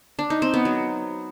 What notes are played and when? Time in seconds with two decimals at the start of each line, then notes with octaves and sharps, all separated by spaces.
0.19 D4
0.30 D#4
0.42 C4
0.54 B3
0.65 F#3